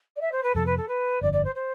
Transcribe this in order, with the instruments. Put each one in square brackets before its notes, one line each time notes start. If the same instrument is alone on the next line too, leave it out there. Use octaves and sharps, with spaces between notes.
[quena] D5
E5
C5
B4
[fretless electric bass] F2 C3 F3 B3 [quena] A4
[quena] B4
A4
B4
[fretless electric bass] G1 F2 D3 [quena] D5
[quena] D5
C5
C5